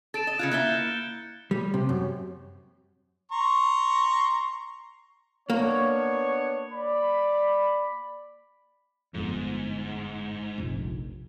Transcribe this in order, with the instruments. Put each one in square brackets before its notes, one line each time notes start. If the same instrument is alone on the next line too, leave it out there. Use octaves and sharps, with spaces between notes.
[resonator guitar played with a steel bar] A4 [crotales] A6 D7 E7
[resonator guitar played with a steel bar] D#5
[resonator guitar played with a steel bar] C#3 F#3 F4 [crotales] F#6 G#6 C#7
[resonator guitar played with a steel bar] A#3 E4 E5 [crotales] F#6 G#6 G7
[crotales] G6
[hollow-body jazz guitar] G3
C3
F#2
[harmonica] A#5 C6 C#6
[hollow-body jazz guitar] A#3 [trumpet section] B3 D4 C#5
[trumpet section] D5 B5
[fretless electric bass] G1 F2 [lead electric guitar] G#2
[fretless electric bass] F1 A#1